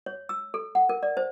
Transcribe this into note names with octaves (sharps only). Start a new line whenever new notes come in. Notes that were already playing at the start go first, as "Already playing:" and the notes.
C#5
E6
A4
F#5
A#4
D5
C5